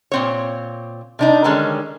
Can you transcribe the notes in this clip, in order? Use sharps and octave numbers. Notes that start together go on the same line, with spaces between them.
A#2 C4 C#5
C3 D4 D#4
D3 D#3 G3 G#3 C#4